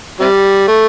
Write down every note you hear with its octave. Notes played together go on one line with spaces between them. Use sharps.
C3 G3
A3